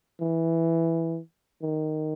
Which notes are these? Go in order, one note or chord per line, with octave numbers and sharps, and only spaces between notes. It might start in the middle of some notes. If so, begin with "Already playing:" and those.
E3
D#3